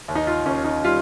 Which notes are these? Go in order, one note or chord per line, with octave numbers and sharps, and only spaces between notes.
D#2
D#4
F4
D#2 C#4
D#4
G3 F4